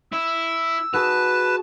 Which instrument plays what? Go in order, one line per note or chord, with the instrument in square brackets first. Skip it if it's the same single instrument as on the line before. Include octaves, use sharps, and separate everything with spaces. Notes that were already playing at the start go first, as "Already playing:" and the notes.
[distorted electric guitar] E4 [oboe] E6
[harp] F#4 G#4 [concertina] B4 [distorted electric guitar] A5